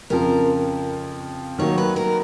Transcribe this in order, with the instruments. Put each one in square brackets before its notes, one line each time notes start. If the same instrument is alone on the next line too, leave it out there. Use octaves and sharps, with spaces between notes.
[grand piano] F2 C#3 F3 [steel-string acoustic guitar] A#4
[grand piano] D#3 F#3 A#3 [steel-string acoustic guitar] C#5
[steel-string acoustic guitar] B4
A#4